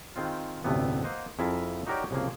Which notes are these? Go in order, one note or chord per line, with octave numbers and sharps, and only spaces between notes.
D#3 G#3 C4 F4
A1 D2 G2 C3 A3 B3
A#3 C5 D#5 F#5
F2 E4 G#4 A#4 E5 A5
D#4 F#4 G4 A#4 C#5 D5
C2 C#3 F3 A#3 G#4